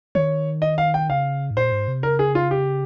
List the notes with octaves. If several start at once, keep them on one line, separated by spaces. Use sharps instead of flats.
D#3 C#5
D#5
F5
G5
C#3 F5
G#2
A#2 C5
G#2
C3
C#3 A#4
G#4
F4
G4